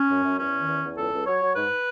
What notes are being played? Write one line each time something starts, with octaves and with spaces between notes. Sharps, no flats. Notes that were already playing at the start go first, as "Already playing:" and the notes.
Already playing: C#4
F#2
F#2
E2 C#4
D#3
E2
E2
C#2 A4
C#2
F#3 C#5
F#3
G#2 B4